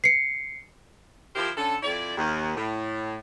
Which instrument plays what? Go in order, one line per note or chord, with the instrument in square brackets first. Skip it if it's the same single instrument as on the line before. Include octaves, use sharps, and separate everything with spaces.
[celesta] C7 C#7
[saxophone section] F3 E4 G4 A#4 C5
D3 C#4 A4
F2 E4 D5
D#2
A2